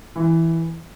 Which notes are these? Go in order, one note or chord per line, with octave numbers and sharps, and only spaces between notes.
E3